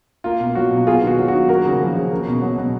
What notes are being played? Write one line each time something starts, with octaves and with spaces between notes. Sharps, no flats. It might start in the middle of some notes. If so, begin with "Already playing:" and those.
A#3 F4
B2
F#3 F#4
B2
B3 F4 G#4
D#3 F#4
F#3
F#4
D#3
A#3 F#4 A#4
C#3
F3
C#3
A#3
B2
F#3
B2